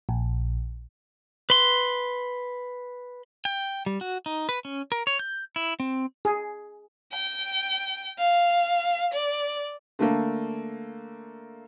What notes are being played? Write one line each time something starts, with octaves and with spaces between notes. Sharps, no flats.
A#1
B4 C6
G5
G3
F#4
D#4
B4
C#4
A#4
C#5
G6
E4
C4
G#4
G5
F5
D5
D3 A3 A#3